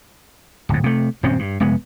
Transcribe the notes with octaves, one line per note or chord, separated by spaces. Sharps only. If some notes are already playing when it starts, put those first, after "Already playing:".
D1 G#2
C3 A3
D#1 F#2 C4 C#4
G2
F1 G#3 B3